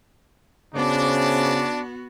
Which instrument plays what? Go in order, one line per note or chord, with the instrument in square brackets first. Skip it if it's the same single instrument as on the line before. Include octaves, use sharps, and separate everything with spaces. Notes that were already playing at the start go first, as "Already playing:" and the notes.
[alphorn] C#3 [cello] B3 F#4 [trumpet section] D4 [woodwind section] C5 D6